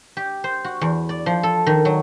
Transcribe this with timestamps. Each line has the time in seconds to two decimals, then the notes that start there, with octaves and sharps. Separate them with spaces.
0.17 G4
0.44 C5
0.65 F#4
0.81 E2
1.09 D5
1.26 F3
1.43 A4
1.66 D#3
1.85 F#3